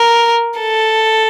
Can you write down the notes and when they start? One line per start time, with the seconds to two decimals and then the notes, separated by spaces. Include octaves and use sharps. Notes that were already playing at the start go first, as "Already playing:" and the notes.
Already playing: A#4
0.59 A4